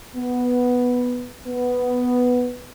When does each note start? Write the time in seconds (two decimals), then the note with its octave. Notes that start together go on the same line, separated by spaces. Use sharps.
0.16 B3
1.47 B3